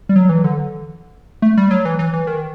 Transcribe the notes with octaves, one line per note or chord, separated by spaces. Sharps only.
G3
F#3
E3
D3
A3
G3
F#3
E3
E3
E3
D#3